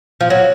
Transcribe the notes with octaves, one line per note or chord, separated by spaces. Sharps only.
F3
F#3